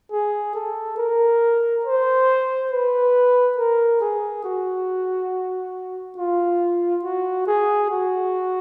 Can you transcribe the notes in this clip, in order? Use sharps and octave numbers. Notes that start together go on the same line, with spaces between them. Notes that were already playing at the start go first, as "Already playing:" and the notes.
G#4
A4
A#4
C5
B4
A#4
G#4
F#4
F4
F#4
G#4
F#4